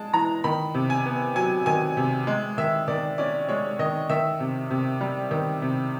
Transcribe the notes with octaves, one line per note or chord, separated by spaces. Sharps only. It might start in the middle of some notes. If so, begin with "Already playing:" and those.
Already playing: G#3 A5
E3 A#5
D#3 B5
C3
G#5
B3
F#3 G#5
D#3 G#5
C3
G#3
D#3 E5
D#3 D5
C#4 D5
G#3 C#5
D#3 D#5
D#3 E5
C3
C3
G3
D#3
C3